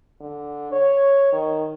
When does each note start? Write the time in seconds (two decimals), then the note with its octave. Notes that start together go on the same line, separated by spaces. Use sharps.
0.20 D3
0.71 C#5
1.32 D#3